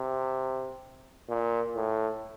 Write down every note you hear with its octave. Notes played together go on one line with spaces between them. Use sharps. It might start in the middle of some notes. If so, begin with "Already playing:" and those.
Already playing: C3
A#2
A2